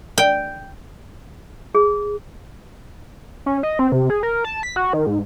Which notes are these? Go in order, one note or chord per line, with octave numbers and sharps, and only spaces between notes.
G5
G#4
C#4
D#5
C4
C3
G#4
A#4
A5
B6
F#4
D#3
G#2